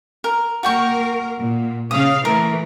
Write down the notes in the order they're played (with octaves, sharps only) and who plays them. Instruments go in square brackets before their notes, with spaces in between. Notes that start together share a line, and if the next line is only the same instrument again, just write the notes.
[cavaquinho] A#4
[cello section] A#3 A#4 [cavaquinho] F#4 G5 C#6
[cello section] A#2
[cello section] C#3 F5 [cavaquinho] D#6
[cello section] E3 A3 [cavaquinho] A#4